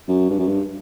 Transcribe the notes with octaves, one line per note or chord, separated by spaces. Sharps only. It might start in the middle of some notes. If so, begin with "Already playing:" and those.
F#2
G2
F#2
G2